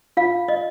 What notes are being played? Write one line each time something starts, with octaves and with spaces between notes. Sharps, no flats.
F4 F5
D#5